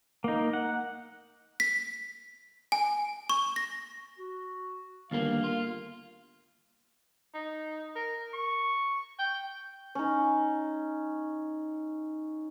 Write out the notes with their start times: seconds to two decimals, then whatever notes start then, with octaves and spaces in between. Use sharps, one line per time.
0.24 A#3 D#4
0.53 F#5
1.60 B6
2.72 G#5
3.30 C#6
3.56 A#6
4.19 F#4
5.11 G1 D#2 A#3 F5
5.44 F4
7.34 D#4
7.95 A#4
8.33 C#6
9.19 G5
9.95 C#4 D#4